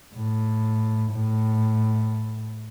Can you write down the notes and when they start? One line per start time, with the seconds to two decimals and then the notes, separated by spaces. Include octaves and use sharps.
0.16 A2
1.12 A2